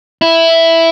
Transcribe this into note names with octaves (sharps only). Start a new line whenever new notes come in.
E4